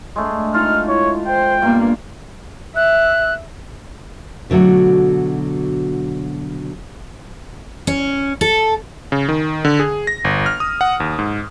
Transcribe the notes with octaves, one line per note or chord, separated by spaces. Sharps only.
G#3 A3 D4
D#4 F4 F6
E4 C#5
C5 G5
G2 A#3 B3
E5 F#6
B2 D3 F#3 A3 F#4
C#4
A4
C#3
D#3
D3
G#4
A#6
G1
F6
D#6
F#5
D#2
G#2